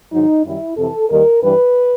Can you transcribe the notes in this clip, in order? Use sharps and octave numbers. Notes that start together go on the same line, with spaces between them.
G#2 D#3 F#3 D#4
F#2 D#3 G3 E4
F2 C3 E3 A4
D#2 D#3 G3 A#4
G2 E3 G3 B4